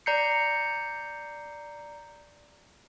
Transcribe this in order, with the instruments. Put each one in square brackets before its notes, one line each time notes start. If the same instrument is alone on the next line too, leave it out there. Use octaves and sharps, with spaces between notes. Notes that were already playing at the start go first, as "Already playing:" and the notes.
[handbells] D5 A#5 G6 C7 C#7